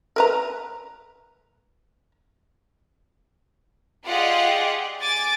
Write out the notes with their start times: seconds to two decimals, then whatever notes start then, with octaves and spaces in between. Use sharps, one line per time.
0.16 A#4 B4 A#5
4.05 F4 G4 G#4 D5 D#5 F#5
4.99 G#5 D6 A6